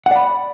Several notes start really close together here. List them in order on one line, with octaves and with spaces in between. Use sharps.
F#5 D5 B5